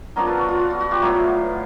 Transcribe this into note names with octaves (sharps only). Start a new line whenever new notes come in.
F#3 B3 D4 F4 A#4 C5
A4 B4
F#4
F4
F#4
F#4
F#4
F4 G4
A2 F#3 B3 E4 F4